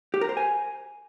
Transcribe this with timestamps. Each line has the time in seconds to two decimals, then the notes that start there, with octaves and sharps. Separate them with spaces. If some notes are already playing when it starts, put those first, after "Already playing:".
0.14 G4
0.21 A#4
0.29 C5
0.37 G#5